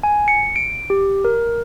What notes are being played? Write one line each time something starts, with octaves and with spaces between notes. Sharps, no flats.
G#5
C#7
D7
G4
A#4